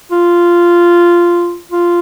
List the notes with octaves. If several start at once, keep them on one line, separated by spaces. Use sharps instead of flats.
F4
F4